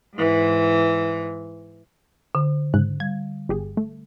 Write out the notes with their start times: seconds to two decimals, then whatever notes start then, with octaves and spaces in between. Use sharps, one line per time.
0.14 G#2 E3
2.35 D3
2.74 G#2 C#3 F#6
3.00 G3 G#6
3.49 G1 G4 G#4
3.77 A3